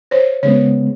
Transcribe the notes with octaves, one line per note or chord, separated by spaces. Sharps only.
C5 C#5
C#3 G#3 B3 C#5